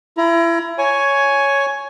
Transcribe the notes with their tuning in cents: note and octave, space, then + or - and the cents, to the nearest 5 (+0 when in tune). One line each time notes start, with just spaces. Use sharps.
E4 +30 A#5 +25
C#5 +5 G#5 +10